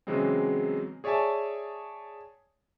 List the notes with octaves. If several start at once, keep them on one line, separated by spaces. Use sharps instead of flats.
C#3 E3 F#3 G#3 B3 C4
G#4 C#5 D5 E5 G#5 A5